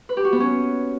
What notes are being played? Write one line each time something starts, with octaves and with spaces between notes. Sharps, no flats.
B4
G4
F#4
B3
C#4